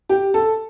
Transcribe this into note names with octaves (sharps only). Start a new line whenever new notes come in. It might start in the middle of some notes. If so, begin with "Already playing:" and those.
G4
A4